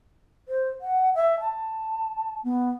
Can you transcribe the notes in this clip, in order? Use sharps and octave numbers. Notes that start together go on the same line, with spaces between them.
C5
F#5
E5
A5
B3